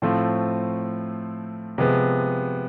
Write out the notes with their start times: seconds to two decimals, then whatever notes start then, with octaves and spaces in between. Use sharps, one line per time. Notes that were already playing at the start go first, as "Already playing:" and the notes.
0.02 A2 F3 A3 C4 F4
1.78 C3 F3 G#3 B3